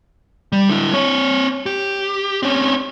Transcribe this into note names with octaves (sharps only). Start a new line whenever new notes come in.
G3
D3 E4
C4 C#5
G4
C4 C#4